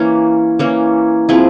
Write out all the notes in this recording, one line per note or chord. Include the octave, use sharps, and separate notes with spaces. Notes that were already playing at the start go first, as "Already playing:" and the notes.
Already playing: E3 A#3 C#4
E3 A#3 C#4
F3 C4 E4 G#4